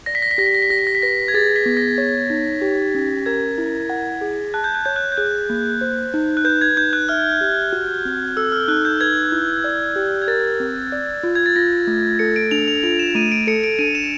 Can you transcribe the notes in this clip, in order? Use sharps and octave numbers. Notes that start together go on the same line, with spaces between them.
D5 A#6
B6
A#6
B6
G4 A#6
B6
A#6
B6
G4 A#6
B6
A#6
B6
B4 A#6
G#6
G#4 A6
B6
B3
A#6
C#5
D#4
G4
C#4
A#4 G#6
E4
F#5
G#4
A5 F#6
G6
F#6
C#5 G6
F#6
G6
G#4 F#6
A#3
C5
D#4
F#6
B4 G6
G#6
D#4 G6
F#6
E5 F6
G4
F#4
C4
A4 E6
F6
D#4 F#6
G6
B4 G#6
E4
D5
G4
G#6
A#4 A6
C4
D5
F4
G#6
A6
F4 A#6
A3
A4 C#7
D7
D4 F7
F7
F4 F7
E7
A3 D#7
D7
A4 C#7
D7
D4 D#7
E7